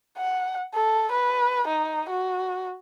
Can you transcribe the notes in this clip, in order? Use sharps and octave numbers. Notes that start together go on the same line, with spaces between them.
F#5
A4
B4
D#4
F#4